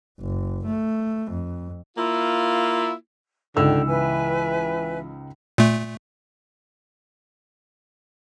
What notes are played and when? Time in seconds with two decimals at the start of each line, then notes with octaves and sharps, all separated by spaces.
0.20 F#1
0.66 A3
1.31 F2
1.97 A#3 E4 F4
3.57 C#2 G#2 D3 G5 E6
3.88 E3 B4 E5 G#5
5.58 A#2 A3